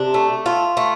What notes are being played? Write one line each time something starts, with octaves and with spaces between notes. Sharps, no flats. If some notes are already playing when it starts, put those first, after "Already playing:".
Already playing: C3 D4
A3
F4
A3